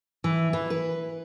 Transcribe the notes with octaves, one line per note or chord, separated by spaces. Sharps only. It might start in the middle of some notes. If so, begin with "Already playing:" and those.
E3
E3
B4